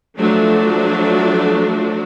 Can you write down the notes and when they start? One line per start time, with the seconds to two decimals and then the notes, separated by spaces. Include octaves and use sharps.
0.19 F3 F#3 A3 D4